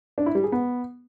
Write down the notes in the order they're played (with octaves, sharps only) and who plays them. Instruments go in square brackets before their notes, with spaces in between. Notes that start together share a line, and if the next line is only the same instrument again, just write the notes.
[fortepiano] D4
E4
G3
G#4
B3